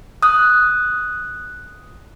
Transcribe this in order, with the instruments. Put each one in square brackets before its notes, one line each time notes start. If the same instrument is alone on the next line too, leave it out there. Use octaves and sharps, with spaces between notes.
[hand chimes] D#6 F#6